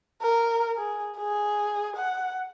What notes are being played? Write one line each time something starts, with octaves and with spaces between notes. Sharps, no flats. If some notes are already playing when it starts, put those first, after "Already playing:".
A#4
G#4
G#4
F#5